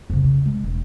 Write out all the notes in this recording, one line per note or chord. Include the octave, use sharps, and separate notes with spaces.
F2 C#3
C#3
G#3
E1